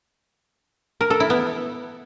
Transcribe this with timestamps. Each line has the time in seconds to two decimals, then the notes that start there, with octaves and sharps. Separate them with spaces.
1.01 A#4
1.10 A4
1.20 E4
1.30 B3